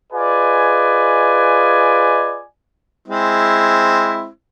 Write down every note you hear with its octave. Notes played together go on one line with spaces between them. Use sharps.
F4 G#4 B4 D5 D#5 G#5
G#3 C4 E4